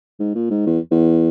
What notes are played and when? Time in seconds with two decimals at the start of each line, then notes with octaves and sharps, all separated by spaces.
0.19 G#2
0.35 A#2
0.50 G#2
0.66 E2
0.91 E2